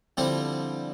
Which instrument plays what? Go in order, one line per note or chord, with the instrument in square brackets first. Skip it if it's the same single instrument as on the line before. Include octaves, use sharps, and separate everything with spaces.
[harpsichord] D3 F3 G3 C4 E4 G4